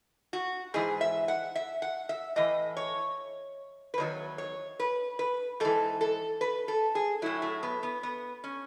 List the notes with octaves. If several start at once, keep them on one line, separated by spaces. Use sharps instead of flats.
F#4
G#2 E3 G#4
E5
F#5
E5
F#5
E5
A2 E3 D#5
C#5
B4
E2 D#3 F#3 C#5
C#5
B4
B4
G#2 E3 A4
A4
B4
A4
G#4
A2 F#3 E4
A3
B3
B3
B3
C#4